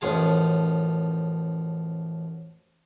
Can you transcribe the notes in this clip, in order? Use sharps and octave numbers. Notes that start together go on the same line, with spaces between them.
A1 F#2 F3 G#4 A5